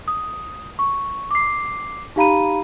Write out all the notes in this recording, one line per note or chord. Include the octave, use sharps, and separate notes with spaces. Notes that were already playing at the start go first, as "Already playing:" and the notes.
D#6
C#6
D6 C7
D#4 G4 F5 A#5 B5 D#7